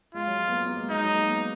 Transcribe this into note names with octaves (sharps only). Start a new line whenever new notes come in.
G#3 F4
F#3
G#3
B3
A#3
A#3
G#3
G#3 D#4
F#3
A#3
B3